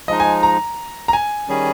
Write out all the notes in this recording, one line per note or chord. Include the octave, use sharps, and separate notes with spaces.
F3 G#3 D#4 D#5
G#5
A#5
A#5
G#5
D#3 G3 C#4 G#4